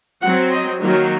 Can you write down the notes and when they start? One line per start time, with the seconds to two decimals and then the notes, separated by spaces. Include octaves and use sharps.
0.22 F#3 C4 F#5
0.52 D#5
0.81 D#3 F#3 A#3